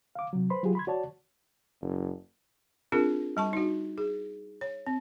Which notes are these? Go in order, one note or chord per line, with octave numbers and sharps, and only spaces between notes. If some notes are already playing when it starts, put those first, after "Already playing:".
F5 D6
C3 F#3
B4 C5 B5 C6
F#3 F4 G4 G#4
B5 C6 G#6
F#4 C#5 D5 A5
F#1
C4 D4 F4 G#4 A#4
G3 A5 C#6
D#4 F#4
G#4
C#5
C4